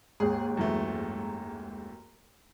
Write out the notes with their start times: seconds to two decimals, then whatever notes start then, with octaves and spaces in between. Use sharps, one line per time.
0.20 D#2 G#2 G#4
0.57 F#2 E3 A3